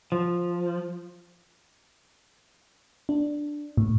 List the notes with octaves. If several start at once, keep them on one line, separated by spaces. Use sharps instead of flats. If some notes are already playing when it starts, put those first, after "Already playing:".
F3
D4
A2